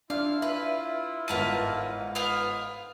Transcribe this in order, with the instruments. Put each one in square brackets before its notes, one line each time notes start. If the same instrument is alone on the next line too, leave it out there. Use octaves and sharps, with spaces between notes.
[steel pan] D4 [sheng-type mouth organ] E4 F4 [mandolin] F5
[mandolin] B4 [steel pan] E5
[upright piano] G1 G#2 D#7 [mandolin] A#4 B4 A5
[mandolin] B3 F4 F5